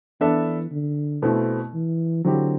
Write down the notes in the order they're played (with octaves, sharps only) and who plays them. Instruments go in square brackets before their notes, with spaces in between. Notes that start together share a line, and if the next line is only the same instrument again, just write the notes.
[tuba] E3 [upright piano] B3 D4 A4 E5
[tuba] D3
[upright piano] B2 A3 C4 E4
[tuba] E3
[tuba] D3 [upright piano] F#3 C4 E4 G4